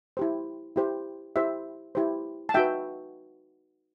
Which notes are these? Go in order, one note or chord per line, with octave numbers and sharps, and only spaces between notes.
E4 G4 C5
E4 G4 C5
E4 G4 C5 E5
E4 G4 C5
A5
D#4 F#4 B4 E5 G5